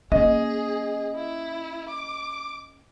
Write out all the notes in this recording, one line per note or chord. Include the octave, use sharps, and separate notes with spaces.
A#3 C#4 G#4 D#5
E4
D6